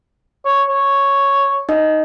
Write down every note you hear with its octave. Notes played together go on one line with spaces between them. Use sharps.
C#5
C#5
D#4 D#5